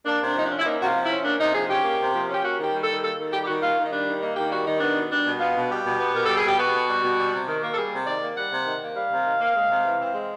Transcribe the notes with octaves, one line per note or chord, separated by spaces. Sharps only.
A#3 D4
C3
D4
F3 D#4
C#4 D4
E4
A#3 D#4
C3 F#4
F4
F3
E4
C#4
A#3 D4
C3 D#4
F3 G#4
C#4 G4
A#3
C3
F3
C#4 G4
A#3 F#4
D#3
G4
G3
D#3 A4
A#3 A4
D#3
G3 G4
G4
D#3 F#4
A#3 F4
D#3
D#4
G3 D4
D#3
A#3 D#4
D#3 G4
G3 F#4
D#3 D#4
B3 D4
B2
G3 D4
B2
B3 F4
B2
G3 G4
B2
B3
B2 A#4
G3 A4
G#4
B2 G4
B3 F#4
B2
G3
B2
G3
C3
D#3
A#3
A4
G3 G#4
C3
D#3 D5
A#3
G3 F#5
C3
D#3
A#3
G3 F5
C3
D#3
A#3
G#3
C3
E3
C4
G#3